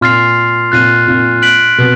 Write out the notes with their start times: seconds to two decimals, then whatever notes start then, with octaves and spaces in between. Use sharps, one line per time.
0.01 A#2 C6 F6 A6 C7 F7
0.72 A#2 F#6 A6 C7 D#7
1.08 A#2
1.42 F#6 B6 D7 F#7
1.78 B2